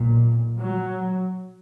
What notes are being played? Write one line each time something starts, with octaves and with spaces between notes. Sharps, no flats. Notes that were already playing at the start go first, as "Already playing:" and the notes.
Already playing: B1 A#2
F#3